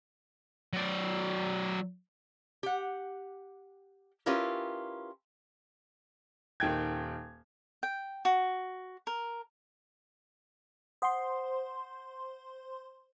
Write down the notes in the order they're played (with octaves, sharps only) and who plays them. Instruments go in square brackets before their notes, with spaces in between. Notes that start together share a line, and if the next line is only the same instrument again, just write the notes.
[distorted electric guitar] F#3 D5
[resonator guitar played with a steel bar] G4 F#5
C#4 E4 F4 G4 A#4 B4
[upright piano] D#1 D#3 G5 G#6
[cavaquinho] G5
F#4
A#4
[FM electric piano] C5 C6 [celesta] F#5 D#6